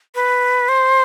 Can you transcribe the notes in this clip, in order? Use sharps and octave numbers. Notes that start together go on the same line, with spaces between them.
B4
C5